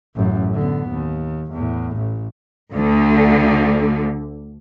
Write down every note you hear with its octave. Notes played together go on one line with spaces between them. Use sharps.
A1 F#2
D3 B3
D#2
E2 A2
A1
D2 D3